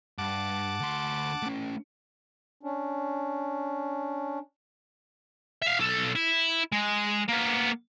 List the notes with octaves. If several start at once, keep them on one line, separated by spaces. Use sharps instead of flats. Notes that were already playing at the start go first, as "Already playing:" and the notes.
G2 F#5 A5 D6
D2 C6
A3 C#4
C#4 D4
E5 F5
B1 A4
E4
G#3
A#3 B3